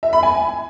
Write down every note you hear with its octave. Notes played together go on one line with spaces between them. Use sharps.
E5
B5
G#5